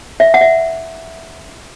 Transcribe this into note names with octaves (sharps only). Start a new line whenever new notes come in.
E5
F#5
E5